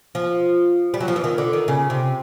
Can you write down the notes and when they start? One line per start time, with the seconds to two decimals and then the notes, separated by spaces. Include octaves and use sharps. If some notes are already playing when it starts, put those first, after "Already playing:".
0.15 F3
0.94 G3
1.00 F#3
1.08 F3
1.16 E3
1.24 D#3
1.38 D3
1.53 D#3
1.68 C#3
1.90 C3